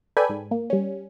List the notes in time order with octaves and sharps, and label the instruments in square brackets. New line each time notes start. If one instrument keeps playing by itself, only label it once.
[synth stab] A4 B4 D5 G5 G#5 B5
G#2
A#3
G3 C#4